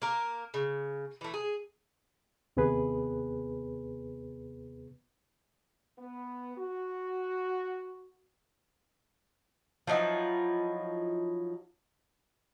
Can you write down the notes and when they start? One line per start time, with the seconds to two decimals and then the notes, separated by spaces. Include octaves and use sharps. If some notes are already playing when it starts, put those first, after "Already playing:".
0.02 A#3 A#4
0.54 C#3
1.21 E3 A3
1.34 G#4
2.57 D#2 C3 B3 G#4 B4
5.99 B3
6.58 F#4
9.87 F3 F#3 D#4 E4